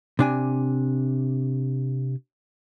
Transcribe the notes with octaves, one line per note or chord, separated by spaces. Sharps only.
C3 D4 G#5